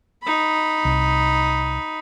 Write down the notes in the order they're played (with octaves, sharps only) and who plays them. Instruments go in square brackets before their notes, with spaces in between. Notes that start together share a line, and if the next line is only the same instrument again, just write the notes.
[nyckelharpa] D#4 B5
[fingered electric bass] C2